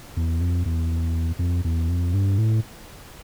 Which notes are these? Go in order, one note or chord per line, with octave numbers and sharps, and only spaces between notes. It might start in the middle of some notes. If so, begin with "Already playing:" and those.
E2
F2
E2
F2
E2
F2
G2
A2